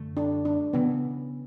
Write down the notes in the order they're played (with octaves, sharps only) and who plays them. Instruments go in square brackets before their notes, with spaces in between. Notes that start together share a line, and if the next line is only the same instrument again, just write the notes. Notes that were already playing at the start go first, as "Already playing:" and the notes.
Already playing: [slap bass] F#2 D3 A3
[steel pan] D4
D4
[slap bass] C#3 E3 [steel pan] B3